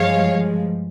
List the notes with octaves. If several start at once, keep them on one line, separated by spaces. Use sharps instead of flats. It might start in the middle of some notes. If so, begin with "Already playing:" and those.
Already playing: G2 F3 G#3 C#5 F5